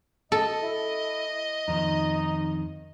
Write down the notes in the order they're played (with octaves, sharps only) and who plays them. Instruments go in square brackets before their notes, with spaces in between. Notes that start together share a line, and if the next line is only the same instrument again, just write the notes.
[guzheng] A4 [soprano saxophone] D#5
[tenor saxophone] E4
[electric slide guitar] F2 D#3 [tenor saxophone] D#4